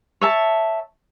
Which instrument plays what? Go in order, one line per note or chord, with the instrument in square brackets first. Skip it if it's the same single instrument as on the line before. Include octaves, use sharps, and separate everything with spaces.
[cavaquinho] C#5 E5 A5